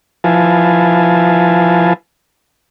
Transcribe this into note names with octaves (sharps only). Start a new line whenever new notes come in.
F3 E4 B4 F5 G#5 A5